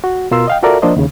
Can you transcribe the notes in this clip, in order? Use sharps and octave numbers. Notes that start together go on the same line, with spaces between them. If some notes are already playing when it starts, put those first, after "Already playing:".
F#4
B2 F4 A#4 C6 E6
D#5 F5 G5
F4 F#4 A4 A#4 D5 E5
F3 A#3 D4 C5 D#5
D#2 C#3